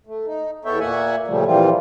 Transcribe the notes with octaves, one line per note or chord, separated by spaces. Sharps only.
A3
D#4
E2 B3 A4 C#5 E5 G5
A#2 A#3 E5 F#5 G#5
A#2 C#3 F3 G3 A3
A#2 E3 F3 G3 C4 F4